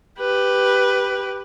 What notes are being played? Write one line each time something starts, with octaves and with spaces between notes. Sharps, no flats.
G4 B4